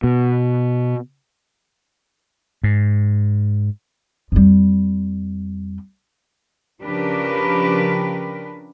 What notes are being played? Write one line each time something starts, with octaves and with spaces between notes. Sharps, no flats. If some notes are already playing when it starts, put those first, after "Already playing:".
B2
G#2
F2 G3
C#3 F3 D4 G4 A#4 B4